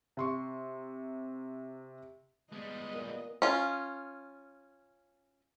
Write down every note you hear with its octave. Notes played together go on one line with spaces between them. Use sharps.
C3 C6 C#6
G3 G#3 B3 D#5
A#2
C#4 F4